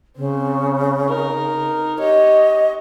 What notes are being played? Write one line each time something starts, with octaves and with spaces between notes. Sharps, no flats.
C#3 C4
D#4 A#4
G4 C#5 D#5